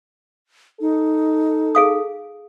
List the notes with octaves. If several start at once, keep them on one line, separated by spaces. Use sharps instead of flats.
D#4 A4
G#4 F5 D#6